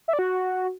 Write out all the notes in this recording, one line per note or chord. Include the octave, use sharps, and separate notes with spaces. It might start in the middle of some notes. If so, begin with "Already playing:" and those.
E5
D5
F#4